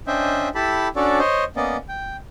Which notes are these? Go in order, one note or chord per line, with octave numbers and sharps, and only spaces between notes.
C#4 D4 C5 D#5 E5 G5
E4 G4 A4 A5 B5
C#4 D4 F#4 A4 C#5 D5
C5 C#5 D#5
A#3 B3 C#4 D5 D#5
G5